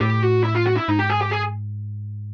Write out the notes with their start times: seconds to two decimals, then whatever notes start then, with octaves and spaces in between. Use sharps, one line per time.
0.01 A2 G4
0.23 F#4
0.44 E4
0.55 F4
0.67 F#4
0.77 E4
0.88 G#2 D#4
0.99 G4
1.10 G#4
1.21 G4
1.31 G#4